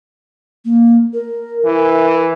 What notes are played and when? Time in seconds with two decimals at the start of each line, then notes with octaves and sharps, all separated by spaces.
0.65 A#3
1.14 A#4
1.65 E3